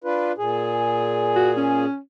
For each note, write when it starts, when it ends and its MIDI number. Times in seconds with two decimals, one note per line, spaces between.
0.04 0.32 62
0.04 0.32 65
0.04 0.32 71
0.38 1.85 46
0.38 1.85 68
1.36 1.51 66
1.57 1.98 61